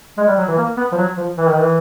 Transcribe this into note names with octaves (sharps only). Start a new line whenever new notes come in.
G#3
G3
F#3
E3
A#3
B3
F3
F#3
F3
E3
D#3
E3